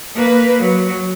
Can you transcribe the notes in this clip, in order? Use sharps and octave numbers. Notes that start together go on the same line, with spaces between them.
A#3 B4
F#3